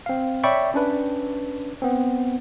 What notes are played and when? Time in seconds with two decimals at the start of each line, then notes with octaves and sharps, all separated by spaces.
0.06 C4 F5
0.44 C#5 D5 E5 G5 B5 C#6
0.74 C#4 D4 B4
1.82 B3 C4